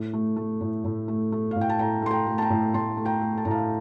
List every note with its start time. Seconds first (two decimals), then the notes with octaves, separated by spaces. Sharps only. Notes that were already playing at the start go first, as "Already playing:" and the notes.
Already playing: A2
0.14 A3
0.37 A3
0.61 A2
0.84 A2
1.08 A3
1.32 A3
1.51 F5
1.56 A2
1.61 G5
1.69 A5
1.79 A2 G5 A#5
2.02 A3 C6
2.11 G5 A#5
2.27 A3
2.38 A5
2.42 G5 A#5
2.50 A2
2.74 A2 A5 C6
2.97 A3
3.05 G5 A#5
3.21 A3
3.38 A5
3.45 A2 A#5
3.51 F5 A5